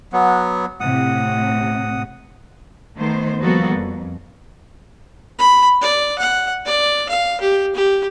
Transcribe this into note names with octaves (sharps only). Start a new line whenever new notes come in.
F#3 B3
A2 C3 F#5 D#6
D#3 A3 B3 C5
F3 G3 A#3 B3 F#4 A4
F2
B5
D5
F#5
D5
F5
G4
G4